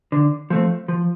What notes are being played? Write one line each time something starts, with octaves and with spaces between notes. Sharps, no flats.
D3
F3 A3 C4
F3